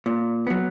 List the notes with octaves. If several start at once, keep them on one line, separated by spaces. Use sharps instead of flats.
A#2
F#3 B3